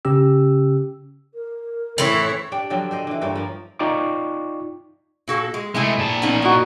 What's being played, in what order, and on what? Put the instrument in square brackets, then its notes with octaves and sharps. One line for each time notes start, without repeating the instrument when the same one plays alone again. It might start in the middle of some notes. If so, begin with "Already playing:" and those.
[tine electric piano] C#3 C#4 G4 E6
[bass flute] A#4
[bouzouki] A2 E3 C4 [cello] E4 C#5
[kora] D4 G4 G5
D3 F3 F#3 C4
D4 C5 D#5
D3 E3
G2 A#3 C5 C#5
F3 A#3
[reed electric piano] D#4 F4 D5 G5 C#6 D6
[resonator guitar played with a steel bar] A#2 F#4 A4
G#3
[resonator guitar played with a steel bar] C3 E4 G#5 [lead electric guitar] G#3 A3
[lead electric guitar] A#2 A5
[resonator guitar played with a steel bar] B3 C#4 D#4
[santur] D#4 F#4 [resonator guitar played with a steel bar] E4